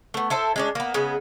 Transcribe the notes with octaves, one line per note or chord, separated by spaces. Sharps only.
A3 B3
E4 A4 C5 E5
G#3 C#4 D4
A#3 B3
C#3 G#3 B3